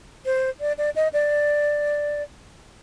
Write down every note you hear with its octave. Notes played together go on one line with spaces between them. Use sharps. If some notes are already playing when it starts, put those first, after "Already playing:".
C5
D5
D5
D#5
D5